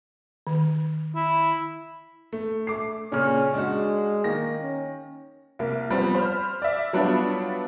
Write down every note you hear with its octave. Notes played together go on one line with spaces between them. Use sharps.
D#3
E4
A3
A3 D6 C7
A#2 C#3 C#4 F6
G#3 D4 F#4
D#3 A#3 A#6
C#4
C2 A#3
F3 G3 B3 C4
C5 B5 F6
D5 E5
F#3 G3 B3 D4 E4 F4